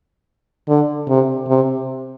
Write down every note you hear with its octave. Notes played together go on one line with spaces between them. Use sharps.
D3
C3
C3